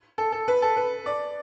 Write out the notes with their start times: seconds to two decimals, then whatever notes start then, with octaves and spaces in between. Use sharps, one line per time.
0.18 A4
0.32 A4
0.48 B4
0.62 A4
0.77 B4
1.06 D5